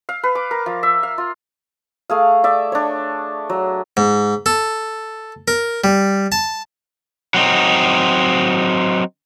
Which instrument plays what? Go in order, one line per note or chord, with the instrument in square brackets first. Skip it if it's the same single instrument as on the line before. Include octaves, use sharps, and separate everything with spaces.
[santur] F5
B4
D6
A#4
F3
E5
F5
F4
A3 G#4 F5
D5 E5
D4 C#5
F#3
[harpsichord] G#2
A4
A#4
G3
A5
[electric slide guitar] F#3 C4 D#4